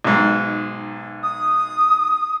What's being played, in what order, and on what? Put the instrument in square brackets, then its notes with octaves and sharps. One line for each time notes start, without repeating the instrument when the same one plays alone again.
[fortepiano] B1 G#2
[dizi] D#6